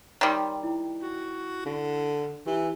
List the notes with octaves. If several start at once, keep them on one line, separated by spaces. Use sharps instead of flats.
D#3 G3 C#5 C6
E4
F#4
D3
E3 E4 G4